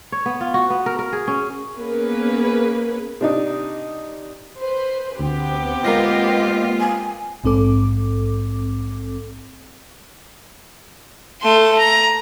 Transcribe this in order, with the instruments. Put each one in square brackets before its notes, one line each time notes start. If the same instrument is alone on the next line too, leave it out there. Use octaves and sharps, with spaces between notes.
[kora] C#5
B3
F4
F#4
B3
A#4
A#4
G#4
C#4
[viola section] A#3 B3 C#4 G#4 A#4 B4
[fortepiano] C3 D4 D#4
[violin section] B4 C5
[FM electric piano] D2 [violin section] B3 C4 G4
[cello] G#3 F4 [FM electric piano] A#3 F5 A#6 [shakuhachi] D#5
[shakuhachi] G#5
[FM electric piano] A#1 G#2 C4 A4 D6
[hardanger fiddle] A3 C6
A#5